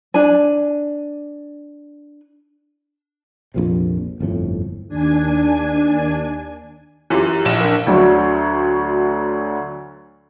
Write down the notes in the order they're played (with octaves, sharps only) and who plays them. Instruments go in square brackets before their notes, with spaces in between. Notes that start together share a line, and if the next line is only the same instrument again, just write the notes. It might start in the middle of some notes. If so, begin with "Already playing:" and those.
[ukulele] D4 G#5
[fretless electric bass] A#1 F2 C3
G1 F2 A2
[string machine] D#2 D4 G#5
[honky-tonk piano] F#2 E3 [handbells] C#4 F4 G4
[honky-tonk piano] A#1 E7
[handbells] D4 A#4
[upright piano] D2 D3 F#3